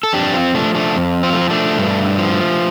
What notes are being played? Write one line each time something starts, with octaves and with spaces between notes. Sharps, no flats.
A4
F2 D4 G4
C4 F4
F3 A3 D4
A3 D4
F2
C4 F4
A3
F3 C4
A3 D4
G2
F3